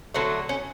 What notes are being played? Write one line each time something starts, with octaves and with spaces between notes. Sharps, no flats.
D3 F#3 A3 C4
C#4